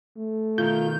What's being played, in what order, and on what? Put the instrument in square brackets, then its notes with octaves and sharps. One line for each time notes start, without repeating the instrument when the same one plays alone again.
[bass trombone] A3
[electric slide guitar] B2 D#3 A#4 [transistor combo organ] F4 [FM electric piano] G6